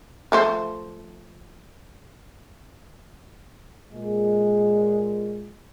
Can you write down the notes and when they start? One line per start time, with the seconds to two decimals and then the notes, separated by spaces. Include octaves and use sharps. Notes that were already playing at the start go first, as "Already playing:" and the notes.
0.32 F3 A3 C5
3.91 A#2 G#3